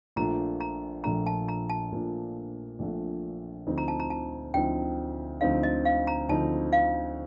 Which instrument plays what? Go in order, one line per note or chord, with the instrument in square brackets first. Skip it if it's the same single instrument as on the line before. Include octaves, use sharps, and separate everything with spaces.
[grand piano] A#1 A#2 F3 A3 D4 [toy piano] A#5
[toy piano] A#5
[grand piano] A#1 A#2 F3 A3 D4 [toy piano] A#5
[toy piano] A5
A#5
A5
[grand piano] A#1 A#2 F3 A3 D4
A#1 A#2 F3 A3 D4
D2 D3 F3 C4 D#4
[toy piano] A#5
A5
A#5
A5
[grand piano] D2 D3 F3 C4 D#4 [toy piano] G5
[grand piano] D2 D3 F3 C4 D#4 [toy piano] F5
[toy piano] D#5
F5
A#5
[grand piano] D2 D3 F3 C4 D#4 [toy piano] A5
[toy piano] F5